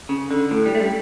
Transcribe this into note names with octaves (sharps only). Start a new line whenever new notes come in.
C#3
D3
A2
G3
A3
G3